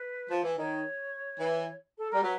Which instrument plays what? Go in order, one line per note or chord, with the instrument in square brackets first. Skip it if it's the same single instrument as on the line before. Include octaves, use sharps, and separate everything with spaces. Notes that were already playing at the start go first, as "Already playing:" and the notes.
Already playing: [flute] B4
[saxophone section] F3
E3
[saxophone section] D#3 [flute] C#5
[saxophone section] E3
[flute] A4
[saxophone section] G3 [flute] A#4
[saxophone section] F#3 [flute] B4